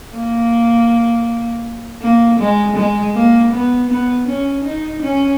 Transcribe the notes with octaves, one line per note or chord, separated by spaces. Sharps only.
A#3
A#3
G#3
G#3
A#3
B3
B3
C#4
D#4
C#4